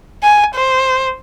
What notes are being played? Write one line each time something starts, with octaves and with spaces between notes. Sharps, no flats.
G#5
C5